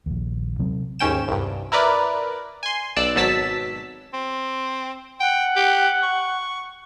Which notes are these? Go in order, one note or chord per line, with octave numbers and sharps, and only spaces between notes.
A#1 D#2
C3 F#3 C4
D#2 G#2 C#4 G5 E7
C2 G2
E4 A#4 B4 D5
G#5 C6
B1 D5 E6 F#6
G#1 B2 F#3 A5 E6 B6
C4
F#5 G5
G4
C#6